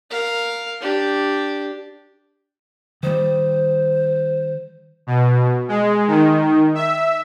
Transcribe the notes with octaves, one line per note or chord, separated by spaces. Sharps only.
A#4 F5
D4 G4
D#3 G3 C5
B2
G#3
D#3
E5